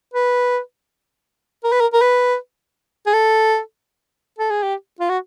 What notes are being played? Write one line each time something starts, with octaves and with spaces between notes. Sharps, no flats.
B4
A#4
B4
A#4
A#4
B4
G#4
A4
A4
G#4
G4
F4
F#4